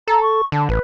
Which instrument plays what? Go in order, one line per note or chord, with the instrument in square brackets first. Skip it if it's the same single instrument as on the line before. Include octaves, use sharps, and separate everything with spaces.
[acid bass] A4 [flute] A#5
[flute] C#6
[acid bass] D3 [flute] A5
[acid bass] A1 [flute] B4